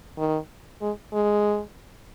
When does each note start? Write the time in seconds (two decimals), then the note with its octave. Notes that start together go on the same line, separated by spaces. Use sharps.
0.18 D#3
0.82 G#3
1.13 G#3